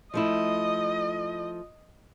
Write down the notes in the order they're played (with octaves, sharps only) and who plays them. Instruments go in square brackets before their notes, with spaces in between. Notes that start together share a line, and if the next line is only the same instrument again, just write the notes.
[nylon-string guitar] F3 A3 E4 [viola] D#5